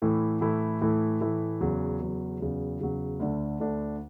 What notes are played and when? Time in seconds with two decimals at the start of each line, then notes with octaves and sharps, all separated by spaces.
0.02 A2 E3 A3 E4
0.41 A2 E3 A3 E4
0.82 A2 E3 A3 E4
1.21 A2 E3 A3 E4
1.61 E2 C#3 F#3
2.00 E2 C#3 F#3
2.40 E2 C#3 F#3
2.80 E2 C#3 F#3
3.20 D2 D3 A3 D4
3.60 D2 D3 A3 D4